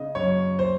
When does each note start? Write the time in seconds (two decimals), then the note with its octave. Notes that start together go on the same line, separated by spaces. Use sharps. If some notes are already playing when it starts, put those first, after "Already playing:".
Already playing: C#3 D#5
0.15 F#2 C#5
0.59 C5